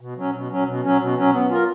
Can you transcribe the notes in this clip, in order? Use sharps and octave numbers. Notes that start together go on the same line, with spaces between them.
B2
F#3 C#4
B2
F#3 C#4
B2
F#3 C#4
B2
F#3 C#4
B3
F4 A#4